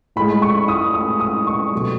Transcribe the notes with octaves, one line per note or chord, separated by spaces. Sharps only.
A2 G#3 B5
C#6
D#6
D#6
D#6
C#6
B2 F#3 A3